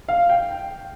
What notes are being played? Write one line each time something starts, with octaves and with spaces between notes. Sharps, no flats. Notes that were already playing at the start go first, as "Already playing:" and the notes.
F5
G5
G5